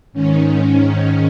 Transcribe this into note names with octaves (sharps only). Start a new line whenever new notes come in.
G#2 D#3 C#4